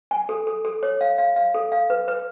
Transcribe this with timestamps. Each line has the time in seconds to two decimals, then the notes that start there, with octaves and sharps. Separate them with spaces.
0.11 G#5
0.29 A4
0.47 A4
0.65 A4
0.83 C#5
1.01 F5
1.18 F5
1.36 F5
1.55 A4
1.72 F5
1.90 B4
2.08 B4